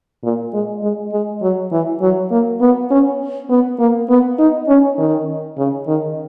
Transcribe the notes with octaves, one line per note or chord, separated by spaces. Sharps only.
A#2
G#3
G#3
G#3
F#3
E3
F#3
A#3
B3
C#4
B3
A#3
B3
D#4
C#4
D#3
C#3
D#3